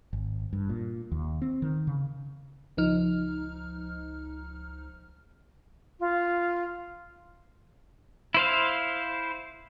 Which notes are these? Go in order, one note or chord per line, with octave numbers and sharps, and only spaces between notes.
G#1
G2
A#2
D#2
C4
D#3
C#3
C#2 F3 D#4 F6
F4
E4 C5 F5